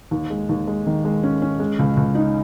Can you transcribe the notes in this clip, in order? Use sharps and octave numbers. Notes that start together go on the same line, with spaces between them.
D#2
G#3
D#2
G#3
D#3
G#3
C#4
C#4
G#3
C#2
C#2
D#4